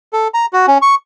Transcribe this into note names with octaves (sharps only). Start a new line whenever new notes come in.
A4
A#5
F#4
C#4
C#6